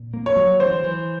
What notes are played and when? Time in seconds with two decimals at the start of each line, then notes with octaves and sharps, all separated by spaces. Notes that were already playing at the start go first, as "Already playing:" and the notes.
Already playing: A#2
0.14 A#3
0.26 C#5
0.37 F#3
0.60 E3 C5
0.84 E3